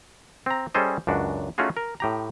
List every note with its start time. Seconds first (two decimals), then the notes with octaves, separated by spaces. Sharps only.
0.46 C4 A#5
0.75 G3 C#4 G#4 A4 C5 D#5
1.07 C#2 F#2 D4 F#4
1.58 A3 C#4 D#4 F4 F#4 G#4
1.77 A#4
2.00 A2 G4 A#5